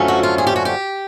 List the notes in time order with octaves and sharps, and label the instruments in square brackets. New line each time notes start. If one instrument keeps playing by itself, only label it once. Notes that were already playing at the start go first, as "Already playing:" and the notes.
Already playing: [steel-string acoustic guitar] F#2 D3 F3 A3 C#4
F#4
F4
G#4
G4
F#4
G4